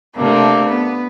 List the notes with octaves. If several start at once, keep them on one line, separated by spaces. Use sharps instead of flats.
C3 A3 A#3 D4
B3